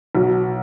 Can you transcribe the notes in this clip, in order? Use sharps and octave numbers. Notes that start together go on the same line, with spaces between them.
B1 B2 F#3